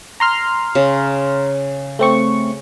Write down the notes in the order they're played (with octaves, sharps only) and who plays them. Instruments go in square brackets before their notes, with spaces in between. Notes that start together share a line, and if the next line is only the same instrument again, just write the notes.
[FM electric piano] A#5 C6 F6
[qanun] C#3
[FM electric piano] A3 C4 C#6